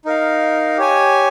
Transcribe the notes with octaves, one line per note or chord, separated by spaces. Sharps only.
D#4 A#4 F5
G4 C#5 G#5